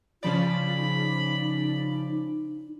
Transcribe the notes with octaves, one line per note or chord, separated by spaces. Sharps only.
C#3 F3 F4 D5 B5
D#4